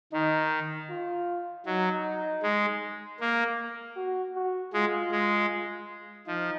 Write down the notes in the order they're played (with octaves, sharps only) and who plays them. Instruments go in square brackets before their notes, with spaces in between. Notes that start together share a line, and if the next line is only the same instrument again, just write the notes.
[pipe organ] D#3 [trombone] D#4
[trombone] F4
[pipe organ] F#3 [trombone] D#4
[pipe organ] G#3
A#3
[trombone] F#4
F#4
[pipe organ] G#3 [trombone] F4
[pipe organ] G#3
[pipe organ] F3 [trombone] D#4